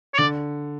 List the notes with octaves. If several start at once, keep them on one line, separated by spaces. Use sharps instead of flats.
C#5
D3 D5